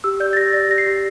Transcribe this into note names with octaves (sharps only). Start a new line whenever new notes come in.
G4 E6
D5 G6
A6
G4 A#6
D5 A#6
G4 A#6
C7
G4